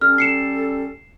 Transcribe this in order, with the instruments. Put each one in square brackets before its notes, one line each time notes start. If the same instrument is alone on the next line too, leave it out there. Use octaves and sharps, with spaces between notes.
[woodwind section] G3 C#4 A4 [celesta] F6
[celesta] C7 C#7 E7